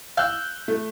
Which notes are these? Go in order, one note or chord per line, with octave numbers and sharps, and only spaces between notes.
F5 E6 F#6 G6
A3